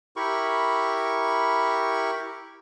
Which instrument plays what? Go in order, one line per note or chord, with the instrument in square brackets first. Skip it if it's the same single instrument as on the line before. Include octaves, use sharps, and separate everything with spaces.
[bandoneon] E4 G4 A#4 B5 C#6